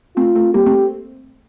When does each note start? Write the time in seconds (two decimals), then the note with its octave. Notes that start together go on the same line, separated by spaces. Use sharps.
0.16 A3 C4 F4
0.35 A3 C4
0.54 G3 A#3 G4
0.66 A3 C4